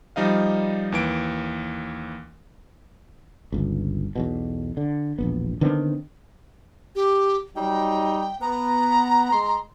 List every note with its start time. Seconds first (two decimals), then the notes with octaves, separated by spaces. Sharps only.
0.16 F3 G3 D#4 D#5 F5
0.92 D#2 E3 D7
3.53 G1 C#2
4.16 B1 E2 B2
4.77 D3
5.18 E1 A#1 B3
5.61 D3 D#3 B3 C4
6.95 G4
7.56 F#3 G3 D#4 G5
8.41 B3 A#5
9.33 G#3 C6